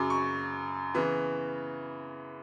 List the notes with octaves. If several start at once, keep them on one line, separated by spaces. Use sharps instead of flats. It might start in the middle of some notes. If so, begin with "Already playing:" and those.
Already playing: F#2 C#3 F#3 D6
C#6
C#3 E3 B3